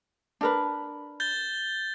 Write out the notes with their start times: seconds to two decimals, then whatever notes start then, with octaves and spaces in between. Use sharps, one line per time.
0.41 D4 A#4 B4
1.20 G6 A6 G7